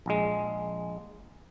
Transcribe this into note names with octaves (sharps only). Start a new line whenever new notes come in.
A#1 G#3